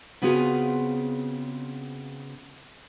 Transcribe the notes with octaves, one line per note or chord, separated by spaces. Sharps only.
C#3 B3 C4 F4 F#4 G#4